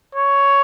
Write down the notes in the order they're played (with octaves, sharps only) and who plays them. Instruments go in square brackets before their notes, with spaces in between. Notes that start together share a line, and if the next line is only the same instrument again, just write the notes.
[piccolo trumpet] C#5